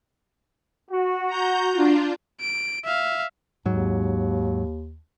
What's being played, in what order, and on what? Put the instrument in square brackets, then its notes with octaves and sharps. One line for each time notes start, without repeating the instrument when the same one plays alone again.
[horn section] F#4
[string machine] A#5 G6
D4 F4
[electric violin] D7
E5 F5
[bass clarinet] D#2 [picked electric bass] G#2 F#3